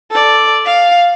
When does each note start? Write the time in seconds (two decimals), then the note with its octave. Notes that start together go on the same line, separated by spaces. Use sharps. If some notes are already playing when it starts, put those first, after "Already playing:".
0.11 A4 D5
0.65 F5